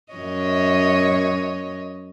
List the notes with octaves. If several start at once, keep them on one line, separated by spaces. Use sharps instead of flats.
F#2 C#5 D#5